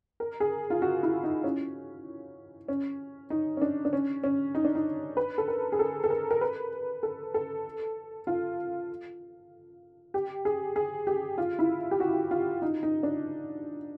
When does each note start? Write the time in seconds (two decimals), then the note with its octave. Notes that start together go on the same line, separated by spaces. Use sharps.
0.20 A#4
0.40 G#4
0.70 F4
0.82 F#4
1.03 E4
1.24 D#4
1.44 C#4
2.68 C#4
3.30 D#4
3.57 C#4
3.62 D4
3.85 D4
3.93 C#4
4.24 C#4
4.55 D#4
4.65 D4
4.75 D#4
5.17 B4
5.38 A4
5.48 A#4
5.72 G#4
5.79 A4
6.04 A4
6.10 A#4
6.31 A#4
6.41 B4
7.03 A4
7.34 A4
8.27 F4
10.14 G4
10.45 G#4
10.76 G#4
11.07 G4
11.38 F4
11.59 E4
11.91 G4
12.00 F#4
12.31 F4
12.62 D#4
12.83 D#4
13.03 D4